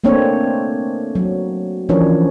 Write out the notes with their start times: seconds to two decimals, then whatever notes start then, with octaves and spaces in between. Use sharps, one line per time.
0.04 A3 A#3 C4 D4 C#5
1.15 F#3
1.89 E3 F3 C#4 D4 A#4 C#5